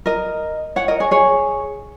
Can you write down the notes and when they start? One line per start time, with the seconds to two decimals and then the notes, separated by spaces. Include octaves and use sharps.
0.06 A#4 D#5
0.76 C#5 F#5
0.88 A#4 D#5
1.00 G#4 C#5
1.11 G#4 C#5